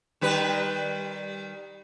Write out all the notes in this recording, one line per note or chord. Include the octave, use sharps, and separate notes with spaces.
D#3 G3 B4